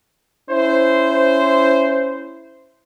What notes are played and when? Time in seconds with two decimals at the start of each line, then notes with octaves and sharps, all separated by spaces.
0.51 C#4 E4 C5